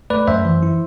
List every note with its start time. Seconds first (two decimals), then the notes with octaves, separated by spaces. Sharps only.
0.10 A3 B4 D5
0.27 F#2 C5 E5
0.45 E3
0.63 E4